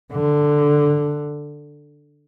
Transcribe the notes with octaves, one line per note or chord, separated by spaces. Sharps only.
D3